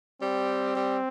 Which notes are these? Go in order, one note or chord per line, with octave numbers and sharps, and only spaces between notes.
G3 C4
G3